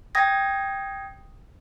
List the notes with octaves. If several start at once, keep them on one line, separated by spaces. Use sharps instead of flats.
G5 D#6 G#6 A#6